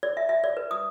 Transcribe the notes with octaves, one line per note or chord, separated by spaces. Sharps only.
D5
E5
E5
D5
B4
D#6